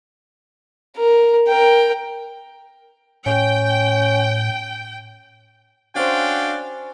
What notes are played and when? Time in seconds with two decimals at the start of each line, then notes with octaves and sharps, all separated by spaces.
0.97 A#4
1.48 A#4 G5
3.26 A2 C#4 G5
5.96 C#4 D4 F#4 C5 F5 G5